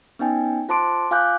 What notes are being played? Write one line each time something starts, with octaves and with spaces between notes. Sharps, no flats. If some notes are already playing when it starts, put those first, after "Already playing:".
B3 C#4 D#4 G5 G#5
F4 C5 A5 C6 D6 D7
F4 F5 G#5 D6 F#6 G6